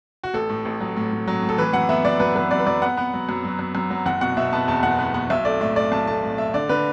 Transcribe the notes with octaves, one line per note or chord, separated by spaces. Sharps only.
F#4
A1 A4
A2
A1
F#3
A2
A2
F#3
A2
A4
E3 B4
F#2 F#5
B3 E5
F#2 D5
F#2 B4
F#2 B4
F#2 D5
B4
F#2 D5
B3 F#5
B3
F#3
F#2
F#3
F#2
F#2
F#3
F#1 F#5
B2 F#5
B2 E5
B3 A5
E2 A5
F#1 F#5
B3
B3 F#5
B1 E5
A3 D5
A2 E5
A3 D5
B1 A5
A3 A5
A2
A3 E5
D3 D5
D3 B4